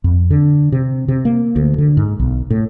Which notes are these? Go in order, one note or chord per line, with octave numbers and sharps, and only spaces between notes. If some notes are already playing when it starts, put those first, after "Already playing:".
F2
D3
C3
C3
A#3
D2
D3
G#2
B1
A2